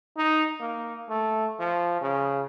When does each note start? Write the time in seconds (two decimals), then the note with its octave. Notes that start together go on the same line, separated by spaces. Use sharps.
0.17 D#4
0.61 A#3
1.10 A3
1.60 F3
2.01 C#3